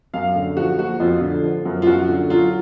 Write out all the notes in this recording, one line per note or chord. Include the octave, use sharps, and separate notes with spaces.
F#2 F5
D3
F3 F#4
A#3 F#4
F2 F4
D3
F3
F#2
F4
F#2 F#4
D3
F#3 F4